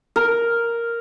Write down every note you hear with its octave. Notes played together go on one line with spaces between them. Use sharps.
A#4